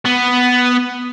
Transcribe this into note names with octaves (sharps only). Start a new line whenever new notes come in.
B3